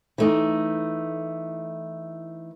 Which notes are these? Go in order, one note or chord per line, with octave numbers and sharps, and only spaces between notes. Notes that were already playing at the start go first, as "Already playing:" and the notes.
E3 A3 D#4